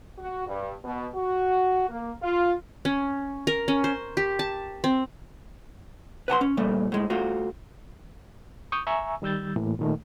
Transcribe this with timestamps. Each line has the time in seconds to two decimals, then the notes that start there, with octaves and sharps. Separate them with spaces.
0.18 F#4
0.48 G2
0.84 B2
1.15 F#4
1.89 A#3
2.23 F4
2.85 C#4
3.47 A#4
3.68 C#4
3.84 C5
4.17 G4
4.39 A5
4.84 C4
6.28 B4 F#5 A5 C6
6.41 C#4
6.57 A#2 G3 A3
6.92 A2 G#3
7.10 A3 F4 F#4
8.72 C#6 D#6 G6
8.87 E5 G#5 A#5 C#6 E6
9.22 D#3 G3 E6 G6 A6
9.56 A2 E3 A#3
9.79 A#2 D#3 A3